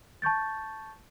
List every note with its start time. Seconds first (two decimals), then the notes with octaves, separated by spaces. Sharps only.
0.22 A5 C#6 G6 A6